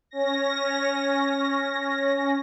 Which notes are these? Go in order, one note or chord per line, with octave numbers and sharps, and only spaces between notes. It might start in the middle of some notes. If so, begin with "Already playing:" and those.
C#4 A#6